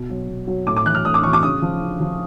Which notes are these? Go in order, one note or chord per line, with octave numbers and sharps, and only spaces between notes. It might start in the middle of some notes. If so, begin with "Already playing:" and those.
Already playing: B2
F#3
B2
F#3
A2 D6
D6
E3 F#6
F6
A2 D#6
D6
E3 C#6
D6
C#3 D#6
F3
C#3
F3